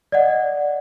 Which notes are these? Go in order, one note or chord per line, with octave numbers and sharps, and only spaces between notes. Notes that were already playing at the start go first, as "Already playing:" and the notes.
D5 D#5 F#5